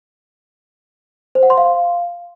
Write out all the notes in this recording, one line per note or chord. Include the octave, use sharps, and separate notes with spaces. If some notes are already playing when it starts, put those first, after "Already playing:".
C5
F#5
C6
F5